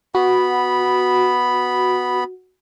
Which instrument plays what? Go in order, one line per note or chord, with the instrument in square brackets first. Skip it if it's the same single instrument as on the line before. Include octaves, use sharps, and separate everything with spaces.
[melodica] B3 B5 [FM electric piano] F#4